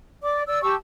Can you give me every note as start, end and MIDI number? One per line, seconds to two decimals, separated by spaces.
0.23 0.42 74
0.23 0.42 86
0.47 0.62 74
0.47 0.62 88
0.63 0.74 67
0.63 0.74 81
0.63 0.74 85
0.63 0.74 88